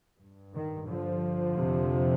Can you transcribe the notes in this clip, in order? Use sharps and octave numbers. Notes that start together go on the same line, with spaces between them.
G2
D#3
D3 F3
F2 C3